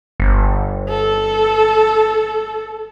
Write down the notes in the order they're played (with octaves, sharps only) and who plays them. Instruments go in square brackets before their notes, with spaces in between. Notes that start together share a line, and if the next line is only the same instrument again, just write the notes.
[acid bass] G1
[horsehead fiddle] A4